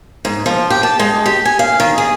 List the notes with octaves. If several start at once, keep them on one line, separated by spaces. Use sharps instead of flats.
G#2
F3
G4
A5
G#3
G4
G#5
F5
D#3
G#4